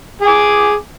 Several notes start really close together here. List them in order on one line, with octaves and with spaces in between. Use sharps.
G#4 G#5 D6